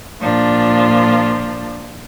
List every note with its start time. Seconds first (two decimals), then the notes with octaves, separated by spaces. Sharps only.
0.20 A#2 F3 D4 F4